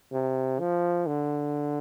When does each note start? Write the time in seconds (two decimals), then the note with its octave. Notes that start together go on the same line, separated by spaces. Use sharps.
0.13 C3
0.60 F3
1.07 D3